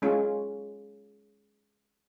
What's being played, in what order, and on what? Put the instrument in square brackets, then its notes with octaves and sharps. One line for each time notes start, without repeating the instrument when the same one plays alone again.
[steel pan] G#3 C#4 F4